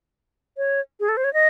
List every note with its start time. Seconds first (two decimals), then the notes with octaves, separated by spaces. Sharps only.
0.57 C#5
1.00 G#4
1.09 A4
1.17 C5
1.24 C#5
1.33 D#5